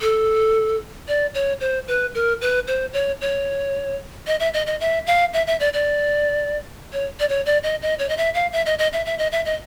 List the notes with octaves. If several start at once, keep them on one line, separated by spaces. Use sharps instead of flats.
A4
D5
C#5
C5
B4
A#4
B4
C5
C#5
C#5
D#5
E5
D#5
D#5
E5
F5
E5
E5
D5
D5
C#5
D5
C#5
D5
D#5
D#5
C#5
D#5
E5
F5
E5
D#5
D#5
E5
E5
D#5
E5
D#5